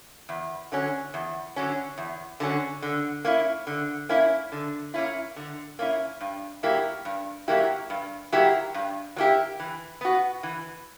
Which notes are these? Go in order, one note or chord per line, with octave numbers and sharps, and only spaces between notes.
E2
D3 F#3 C#4
E2
D3 F#3 C#4
E2
D3 F#3 C#4
D3
A#3 C#4 E4
D3
A#3 C#4 E4
D3
A#3 C#4 E4
D3
A#3 C#4 E4
G2
F#3 A#3 E4 G4
G2
F#3 A#3 E4 G4
G2
F#3 A#3 E4 G4
G2
F#3 A#3 E4 G4
E3
B3 F#4
E3